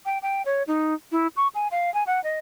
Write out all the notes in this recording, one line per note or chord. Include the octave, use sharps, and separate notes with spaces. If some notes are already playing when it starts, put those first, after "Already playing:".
G5
G5
C#5
D#4
E4
C#6
G#5
F5
G#5
F#5
D#5